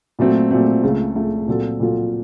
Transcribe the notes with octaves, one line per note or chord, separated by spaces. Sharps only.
A#2 F#3 A3 C4
A#2 F#3 A3 C4
C#2 C#3 A3
C#2 C#3 A3
A#2 F#3 C4 F4 A4
A#2 F#3 C4 F4 A4